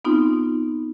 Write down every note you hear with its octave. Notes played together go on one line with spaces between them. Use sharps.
B3 C4 D#4 F4